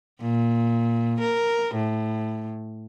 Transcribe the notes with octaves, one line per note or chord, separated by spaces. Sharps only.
A#2
A#4
A2